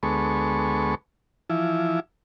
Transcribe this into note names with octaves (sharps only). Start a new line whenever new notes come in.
D2 G#3 B3 A4 C#6
E3 F3 E4